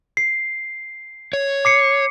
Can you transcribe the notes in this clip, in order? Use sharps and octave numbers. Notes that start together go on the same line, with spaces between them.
C7
C#5
D6 C7 C#7